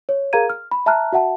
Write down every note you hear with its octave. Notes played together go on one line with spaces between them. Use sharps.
C#5
G#4 A#4 F5 A#5 G#6 D#7
F6
B5
E5 A5 A#5 F6 F#6
F#4 E5 F#5 A5